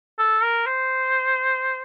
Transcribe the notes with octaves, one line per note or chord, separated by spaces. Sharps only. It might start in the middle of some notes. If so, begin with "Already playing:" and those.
A4
A#4
C5